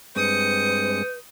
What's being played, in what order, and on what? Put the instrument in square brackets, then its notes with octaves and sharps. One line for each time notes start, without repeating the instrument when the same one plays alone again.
[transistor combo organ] G2 G#3 C4 [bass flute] B4 [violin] D#6 C#7 [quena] G6